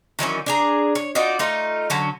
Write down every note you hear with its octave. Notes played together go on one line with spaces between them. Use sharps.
D#3 E3 F#3 C#4
D4 G#4 A#5
C#5
D#4 F4 F#4 D5
A3 D#4 F4
D3 F#3 C#4